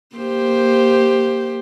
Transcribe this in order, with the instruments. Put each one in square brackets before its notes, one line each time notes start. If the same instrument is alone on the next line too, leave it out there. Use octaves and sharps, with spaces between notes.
[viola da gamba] A#3 G4 C5